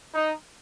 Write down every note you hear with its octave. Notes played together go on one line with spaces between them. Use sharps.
D#4